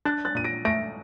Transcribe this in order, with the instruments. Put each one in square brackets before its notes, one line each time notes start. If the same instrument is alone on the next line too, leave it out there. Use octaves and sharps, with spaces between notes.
[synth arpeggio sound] D4 [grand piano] F#6 A6
[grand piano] F#6 A6
[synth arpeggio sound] A#2 [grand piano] D#7
[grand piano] A#6 D7
[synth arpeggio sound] A3 [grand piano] A#6 D7